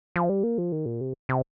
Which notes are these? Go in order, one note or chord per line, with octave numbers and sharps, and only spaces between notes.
F3
G3
A#3
F3
D#3
A#2
C3
C3